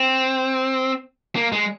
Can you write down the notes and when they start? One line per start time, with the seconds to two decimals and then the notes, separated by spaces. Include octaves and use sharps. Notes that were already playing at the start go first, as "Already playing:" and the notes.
Already playing: C4
1.36 A#3
1.52 G#3